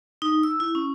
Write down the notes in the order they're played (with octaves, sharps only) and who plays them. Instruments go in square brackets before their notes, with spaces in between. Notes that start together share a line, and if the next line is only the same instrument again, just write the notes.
[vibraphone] D#4
E6
E4
C#4